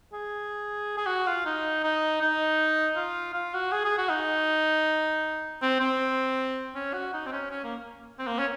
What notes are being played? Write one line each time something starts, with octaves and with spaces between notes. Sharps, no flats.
G#4
G#4
F#4
F4
D#4
D#4
D#4
F4
F4
F#4
G#4
G#4
F#4
D#4
C4
C4
C#4
F#4
D#4
C4
C#4
C#4
A#3
C4
A#3
C#4